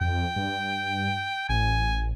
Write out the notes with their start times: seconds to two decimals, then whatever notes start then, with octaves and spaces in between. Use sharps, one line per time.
0.01 F2 G5
0.36 G2
1.49 A1 G#5